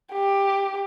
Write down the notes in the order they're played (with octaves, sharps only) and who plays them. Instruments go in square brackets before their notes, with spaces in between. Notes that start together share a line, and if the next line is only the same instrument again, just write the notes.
[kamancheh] G4